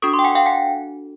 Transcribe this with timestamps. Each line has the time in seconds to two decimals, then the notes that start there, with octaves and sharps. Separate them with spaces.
0.02 D4 F#4 A4 C#6 D#6
0.13 C6 D6
0.19 G5
0.24 F#5 G#5
0.35 F5 G5
0.46 F#5 G#5